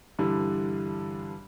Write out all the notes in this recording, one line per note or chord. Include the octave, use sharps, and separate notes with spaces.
G2 D3 E3 G3